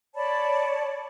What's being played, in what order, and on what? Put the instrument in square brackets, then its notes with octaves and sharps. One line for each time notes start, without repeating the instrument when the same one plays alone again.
[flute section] C#5 D5 A5 B5